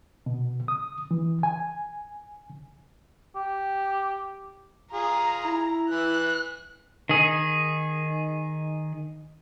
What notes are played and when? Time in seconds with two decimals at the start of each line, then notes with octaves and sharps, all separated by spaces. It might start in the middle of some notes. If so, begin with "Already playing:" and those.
0.26 B2
0.68 D#6
1.11 E3
1.43 G#5
3.35 G4
4.94 F4 G#4 A#5
5.45 E4
5.90 E3 F#6
7.09 D#3 G#4